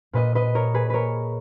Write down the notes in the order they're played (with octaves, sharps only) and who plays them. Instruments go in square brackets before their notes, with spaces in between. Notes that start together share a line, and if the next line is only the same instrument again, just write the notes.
[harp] A#2 B4 D#5
B4 D#5
A#4 C#5
G#4 B4
A#4 B4 C#5